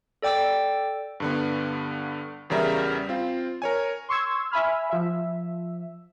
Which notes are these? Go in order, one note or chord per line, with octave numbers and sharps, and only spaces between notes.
A4 D5 G5 D6 E6
G2 D3 B3
E2 C#3 G3 A#4 E5
C4 F4
A#4 C#5 G#5
C6 C#6 E6 G#6
E5 G#5 B5 F6
F3 E5